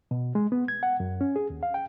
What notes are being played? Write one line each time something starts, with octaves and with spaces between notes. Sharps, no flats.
B2
G#3
B3
G#6
F#5
F#2
C#4
G#4
D#2
F5
G5